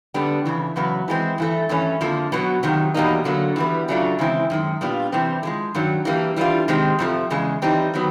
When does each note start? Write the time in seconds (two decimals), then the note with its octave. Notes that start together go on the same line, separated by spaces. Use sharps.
0.14 F2 D3 G3 B3 D4
0.45 F2 C#3 E3
0.76 E2 C#3 F#3 B3
1.08 E3 G#3 C4
1.38 G2 E3 A3
1.69 G2 E3 A3 C#4
2.01 F2 D3 F3 A#3
2.32 B2 F#3 B3
2.63 F2 C3 D#3 F#3
2.94 E2 B2 G3 A#3 D#4
3.25 D3 F#3 A#3
3.56 E3 G3 B3
3.88 C#3 F#3 A3 D4 F4
4.19 C#3 E3 G#3 C4 E4
4.50 F#2 D#3 G#3
4.81 A#2 G3 B3 D4 F4
5.12 C3 E3 G3 C4
5.43 D3 F3 G#3
5.75 G2 D#3 F#3
6.05 E3 G3 A#3 D4
6.36 E3 G3 B3 D4 F4
6.68 C3 D#3 G#3 C4
6.99 F2 C3 F3 A3
7.30 E2 C#3 G#3
7.62 E3 G3 C4 D#4
7.94 D#3 F#3 B3